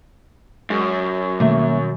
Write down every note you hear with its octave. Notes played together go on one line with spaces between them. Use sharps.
F#2 G#3
B2 D#3 G3 A3 A#3 E5